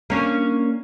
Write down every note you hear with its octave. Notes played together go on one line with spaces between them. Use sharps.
A#3 C#4 D4